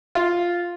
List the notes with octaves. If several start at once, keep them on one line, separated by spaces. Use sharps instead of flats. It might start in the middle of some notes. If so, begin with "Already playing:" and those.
F4